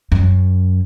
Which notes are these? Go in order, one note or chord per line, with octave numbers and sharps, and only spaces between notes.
F#2